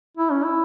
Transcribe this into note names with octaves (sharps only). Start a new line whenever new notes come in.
E4
C#4
E4